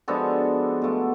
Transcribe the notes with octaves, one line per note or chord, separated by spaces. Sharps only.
F3 G#3 B3 D4 F#4 A4
B2 A3 F4